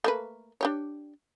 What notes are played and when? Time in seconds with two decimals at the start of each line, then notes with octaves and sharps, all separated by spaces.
0.04 A3 A#3 B4
0.61 D4 G4 C#5